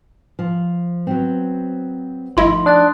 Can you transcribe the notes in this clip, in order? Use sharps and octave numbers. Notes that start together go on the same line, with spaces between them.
F3
F#3 B3 C4
G1 F3 A3 D#4 E4 D#5 C6
D4 D#6 F#6 A6